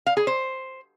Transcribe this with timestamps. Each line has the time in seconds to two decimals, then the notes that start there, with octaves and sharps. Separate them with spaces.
0.06 F5
0.17 G#4
0.27 C5